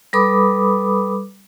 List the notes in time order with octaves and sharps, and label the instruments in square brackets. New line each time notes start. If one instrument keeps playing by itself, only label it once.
[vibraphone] G3 A4 B4 B5 D6 D#6